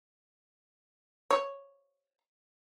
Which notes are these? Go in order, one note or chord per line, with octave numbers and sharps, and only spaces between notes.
C#5